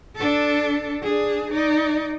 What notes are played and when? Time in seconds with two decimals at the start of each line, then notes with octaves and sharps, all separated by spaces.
0.16 D4 A4
1.02 D4 G#4
1.51 D#4 D5